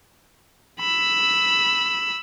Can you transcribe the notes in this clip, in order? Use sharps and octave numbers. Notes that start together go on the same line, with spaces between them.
B5 E6